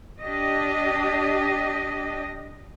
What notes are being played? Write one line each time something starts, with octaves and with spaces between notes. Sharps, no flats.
D4 G4 D#5